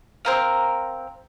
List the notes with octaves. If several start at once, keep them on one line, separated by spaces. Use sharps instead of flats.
C4 A#4 F5